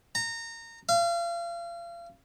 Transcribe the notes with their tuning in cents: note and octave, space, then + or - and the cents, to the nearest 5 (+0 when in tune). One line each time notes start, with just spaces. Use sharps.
A#5 -25
F5 -35